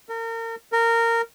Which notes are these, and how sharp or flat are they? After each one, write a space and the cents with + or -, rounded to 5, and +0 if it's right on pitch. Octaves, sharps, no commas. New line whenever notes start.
A#4 -35
A#4 -15